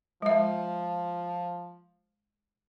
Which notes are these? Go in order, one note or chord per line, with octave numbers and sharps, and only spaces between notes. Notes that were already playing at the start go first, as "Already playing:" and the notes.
F3 G#3 E5